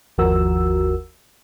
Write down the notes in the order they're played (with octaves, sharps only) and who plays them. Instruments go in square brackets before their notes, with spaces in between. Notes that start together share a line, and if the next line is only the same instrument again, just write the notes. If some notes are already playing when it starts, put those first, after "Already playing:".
[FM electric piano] G1 D#2 F3 F#4 A#4 E6